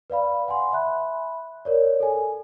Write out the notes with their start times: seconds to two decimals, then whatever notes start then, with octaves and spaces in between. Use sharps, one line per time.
0.10 B4 D5 F5 B5
0.48 F#5 G#5 C6
0.73 E5 B5 F#6
1.65 A#4 C#5 D5
2.00 A4 G#5